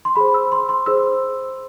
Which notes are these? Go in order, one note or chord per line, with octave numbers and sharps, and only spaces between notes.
C6
G#4 C5 B5
E6
C6
C6
G#4 C5 E6